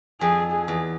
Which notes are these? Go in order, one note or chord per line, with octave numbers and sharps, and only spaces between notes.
F2 G#4
G#4
E2